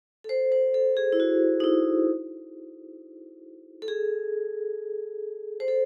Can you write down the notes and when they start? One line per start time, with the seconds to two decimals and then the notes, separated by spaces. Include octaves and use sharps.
0.24 A4
0.29 C5
0.52 C5
0.74 A4
0.97 G#4
1.12 E4
1.20 F#4
1.60 D#4
1.64 E4
3.82 A4
3.88 G#4
5.60 C5
5.68 A4